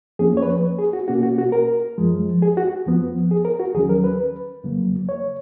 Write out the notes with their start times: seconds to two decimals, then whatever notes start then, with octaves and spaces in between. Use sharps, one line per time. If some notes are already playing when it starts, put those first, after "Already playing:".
0.19 F2 F3 A#3 C#4 G#4
0.37 C#5
0.42 B4
0.78 G#4
0.93 F#4
1.08 B2 A#3 C#4 F#4
1.23 F#4
1.38 F#4
1.52 A#4
1.98 F#2 F3 G#3
2.42 G#4
2.57 F#4
2.86 F2 F3 B3
3.31 G#4
3.45 A#4
3.60 F#4
3.74 D#2 D#3 F#3 C#4 G#4
3.89 A#4
4.04 B4
4.64 F2 C#3 F#3 A#3
5.09 C#5